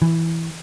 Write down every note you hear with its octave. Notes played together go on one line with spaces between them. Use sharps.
E3